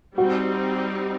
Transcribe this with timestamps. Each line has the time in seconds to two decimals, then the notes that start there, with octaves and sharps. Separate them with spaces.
0.18 G3 C4 D#4 F#4